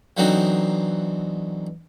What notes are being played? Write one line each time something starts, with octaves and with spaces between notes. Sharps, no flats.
D3 E3 F#3 B3 C4 D#4